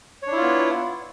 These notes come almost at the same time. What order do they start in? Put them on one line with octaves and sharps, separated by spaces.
C#5 D4 E4 F4 B3